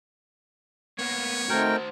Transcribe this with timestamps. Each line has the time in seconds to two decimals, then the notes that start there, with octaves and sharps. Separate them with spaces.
0.99 A#3 B3 C#5
1.50 D#3 A3 C4 F#4 A#4 C5 G5